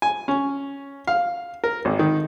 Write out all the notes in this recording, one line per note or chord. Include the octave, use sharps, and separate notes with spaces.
G#5
C#4
F5
A#4
G#1
D#3